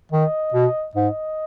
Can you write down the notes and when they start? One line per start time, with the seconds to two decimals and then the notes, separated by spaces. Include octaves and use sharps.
0.12 D#3 D#5
0.54 B2
0.95 G#2 D#5